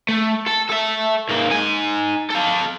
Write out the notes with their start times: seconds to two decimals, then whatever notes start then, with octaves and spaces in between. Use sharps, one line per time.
0.09 A3
0.46 A4
0.69 A4 E5
1.29 G#2 A#3
1.50 D#4 G#5
2.30 A4 F5